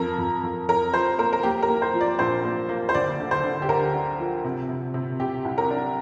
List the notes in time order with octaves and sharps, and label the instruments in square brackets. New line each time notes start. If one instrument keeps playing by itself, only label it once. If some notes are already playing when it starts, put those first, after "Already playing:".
Already playing: [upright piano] F2 A#4
F2
F2
F2 A#4
F3 C5
A#3 A#4
A#4
A#3 G4
A#4
A#3
C5
F3
D5
A#1 C5
A#3
A#3
C5
D2 D5
D3
C5
D3
G4
D2 A#4
D4
F3
C3
C3
C3
C3 G4
C2
A#4
D4